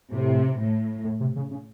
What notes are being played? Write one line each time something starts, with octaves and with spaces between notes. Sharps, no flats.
A2 C3
A2
A2
C3
C#3
C#3